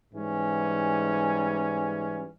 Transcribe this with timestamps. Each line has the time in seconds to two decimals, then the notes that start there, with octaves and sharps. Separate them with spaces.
0.14 G#2 E3 G3 C#4